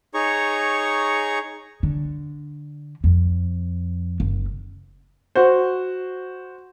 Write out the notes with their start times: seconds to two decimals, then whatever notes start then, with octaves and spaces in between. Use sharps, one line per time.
0.14 D#4 G#4 C#5 A#5 C#6
1.83 D3
3.04 F2
4.20 F#1
5.35 F#4 C5